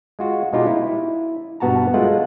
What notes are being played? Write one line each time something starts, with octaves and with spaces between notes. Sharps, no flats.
G#3 F4 F#4
B2 G#3 D#4 F4 G4
E4
G2 B2 B3 F#4 A5 A#5
G#3 A3 F4 F#5